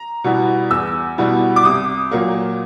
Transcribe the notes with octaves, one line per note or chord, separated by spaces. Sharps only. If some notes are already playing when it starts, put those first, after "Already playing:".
Already playing: A#5
B2 G3 B3 E4
E2 E6
B2 G3 B3 E4
D6
C2 D#6
A#2 F#3 A#3